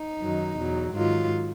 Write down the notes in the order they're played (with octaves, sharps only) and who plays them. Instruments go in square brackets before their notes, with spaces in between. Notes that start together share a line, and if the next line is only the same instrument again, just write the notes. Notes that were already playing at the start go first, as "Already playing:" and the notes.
Already playing: [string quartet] D#4
F#2 D#3 F#3
E2 B2 F#3
G#2 D#3 F#3 F4